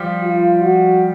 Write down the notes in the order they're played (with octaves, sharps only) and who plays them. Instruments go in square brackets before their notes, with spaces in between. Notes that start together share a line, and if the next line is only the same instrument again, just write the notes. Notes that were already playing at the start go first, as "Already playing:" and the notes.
Already playing: [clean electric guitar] F3 G3
[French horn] F4
F#4